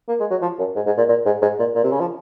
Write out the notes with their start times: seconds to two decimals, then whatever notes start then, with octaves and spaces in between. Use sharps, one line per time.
0.08 A#3
0.20 G#3
0.30 F#3
0.42 F3
0.59 F#2
0.76 G#2
0.86 G#2
0.98 A#2
1.09 A#2
1.26 G#2
1.42 G#2
1.59 A#2
1.75 A#2
1.84 C3
1.92 C#3
2.00 F3